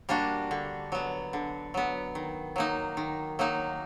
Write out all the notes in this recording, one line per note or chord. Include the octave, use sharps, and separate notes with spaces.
G3 A#3 D4 F#4
D3
F#3 B3
D3
F#3 B3
D#3
F#3 A#3 D#4
D#3
F#3 A#3 D#4